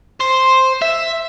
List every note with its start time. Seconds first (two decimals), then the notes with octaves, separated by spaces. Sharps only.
0.20 C5
0.82 E5